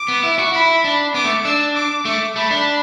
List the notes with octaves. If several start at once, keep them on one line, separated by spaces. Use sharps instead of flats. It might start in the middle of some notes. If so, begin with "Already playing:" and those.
Already playing: D6
B3
E4
F#4
E4 B5
D4
B3 D6
A3
D4 E6
D6
A3 D6
A3 B5
D4